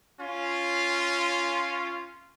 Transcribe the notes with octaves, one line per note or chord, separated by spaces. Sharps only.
C#4 F4